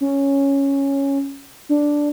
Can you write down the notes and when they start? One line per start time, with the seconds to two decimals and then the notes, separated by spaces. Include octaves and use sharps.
0.01 C#4
1.69 D4